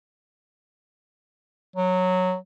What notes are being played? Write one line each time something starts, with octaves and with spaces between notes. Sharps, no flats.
F#3